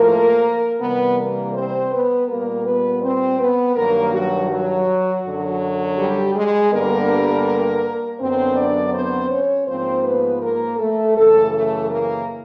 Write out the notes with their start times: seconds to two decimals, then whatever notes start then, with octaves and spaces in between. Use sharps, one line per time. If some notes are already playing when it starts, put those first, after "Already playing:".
Already playing: A2 F3 A3 A#3 A#4
0.80 C3 E3 G3 B3 B4
1.17 A#3 A#4
1.54 C4 C5
1.91 B3 B4
2.28 A#2 G3 A#3 B3 A#4
2.65 B3 B4
3.02 C4 C5
3.39 B3 B4
3.76 G2 D#3 F#3 A#3 A#4
4.13 F#3 F#4
4.50 F#3 F#4
5.25 F#2 D3 F#3
5.98 G3 G4
6.35 G#3 G#4
6.72 G2 D3 G3 A#3 B3 A#4
8.20 F#2 D3 F#3 B3 C4 C5
8.57 D4 D5
8.94 C4 C5
9.31 C#4 C#5
9.68 G#2 F3 A#3 C4 C5
10.05 B3 B4
10.42 A#3 A#4
10.79 A3 A4
11.16 F#2 C#3 E3 A3 A4
11.53 A3 A4
11.90 A#3 A#4